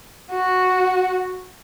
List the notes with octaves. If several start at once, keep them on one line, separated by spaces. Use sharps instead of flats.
F#4